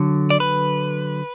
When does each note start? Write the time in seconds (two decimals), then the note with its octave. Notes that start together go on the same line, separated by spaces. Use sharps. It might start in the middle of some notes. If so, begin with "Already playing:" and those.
Already playing: D3 F#3
0.30 D5
0.40 B4